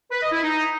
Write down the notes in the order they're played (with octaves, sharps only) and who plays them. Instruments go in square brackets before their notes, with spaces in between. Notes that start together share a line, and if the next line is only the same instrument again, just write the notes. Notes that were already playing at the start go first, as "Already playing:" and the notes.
[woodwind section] B4
D#5
E4
D#4